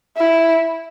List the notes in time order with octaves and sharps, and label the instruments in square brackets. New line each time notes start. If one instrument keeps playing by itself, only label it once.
[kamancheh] E4